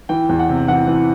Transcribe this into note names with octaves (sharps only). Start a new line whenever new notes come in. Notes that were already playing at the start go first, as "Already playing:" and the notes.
E3 G5
E2
F#5
C3
E3 F#5
E3